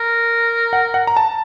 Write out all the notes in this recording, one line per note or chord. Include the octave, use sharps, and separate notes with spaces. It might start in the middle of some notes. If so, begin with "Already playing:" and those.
Already playing: A#4
F#5
F#5
A#5
A5